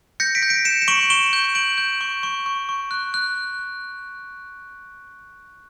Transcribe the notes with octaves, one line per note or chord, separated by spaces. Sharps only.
G6 A#6 C#7
B6 D7
G6
B6 D7
G6 C#7 E7
E7
C#6 D7 F#7
C#6 E7 G7
G6
G6 D7 F#7
G6
C#6
C#6
C#6
C#6
F#6
F#6